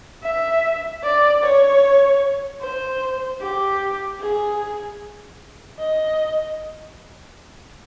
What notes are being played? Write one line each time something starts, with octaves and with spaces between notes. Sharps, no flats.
E5
D5
C#5
C5
G4
G#4
D#5